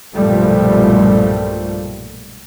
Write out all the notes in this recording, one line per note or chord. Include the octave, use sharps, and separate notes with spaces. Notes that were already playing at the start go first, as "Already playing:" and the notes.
B1 G2 A#2 F3 G3 A3